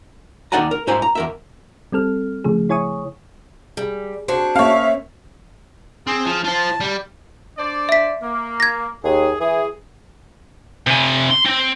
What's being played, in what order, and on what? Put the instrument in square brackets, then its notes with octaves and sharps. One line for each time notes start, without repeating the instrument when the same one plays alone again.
[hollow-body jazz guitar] D#2 D#4 D5 F#5 G#5 A#5
A#4
G#2 E4 C5 G#5 A#5
A#5
E2 A#4 E5
[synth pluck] G3 C4 A4 F6
C#3 F3 A3 G#4
E4 C#5 G#5 C#6 D#6
[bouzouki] G3 [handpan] G#4
[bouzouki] D4 F#4 G#4 [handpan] C5
[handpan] A#3 C#4 [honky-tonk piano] C#5 F5 [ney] E5
[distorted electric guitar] C4 [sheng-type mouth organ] G#4
[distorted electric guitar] F3
[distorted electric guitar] F4 C5 [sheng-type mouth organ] A5
[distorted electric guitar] G3
[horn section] D4 C5 D5
[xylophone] E5 B6
[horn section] A#3
[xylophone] G#6 A#6
[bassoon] D#2 [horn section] G#4
[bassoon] E3 [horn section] G#4
[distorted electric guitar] C3 G#5
C6
C4